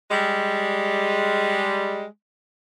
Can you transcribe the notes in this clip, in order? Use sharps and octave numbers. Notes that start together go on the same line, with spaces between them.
G3 G#3